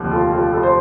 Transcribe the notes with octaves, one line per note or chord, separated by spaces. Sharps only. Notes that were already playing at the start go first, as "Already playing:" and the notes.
Already playing: F1 D#2 D3 F3
F4 A4
F4 A4
F4 A4
C5